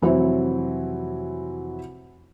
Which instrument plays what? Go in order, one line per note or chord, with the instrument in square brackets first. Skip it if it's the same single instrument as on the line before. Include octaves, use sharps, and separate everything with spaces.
[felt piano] F1 E3 F#3 C4 E4 C5